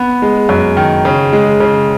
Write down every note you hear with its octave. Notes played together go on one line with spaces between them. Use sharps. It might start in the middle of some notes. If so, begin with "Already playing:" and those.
Already playing: B3
G#3
F#2
D#3
C#3
G#3
C#3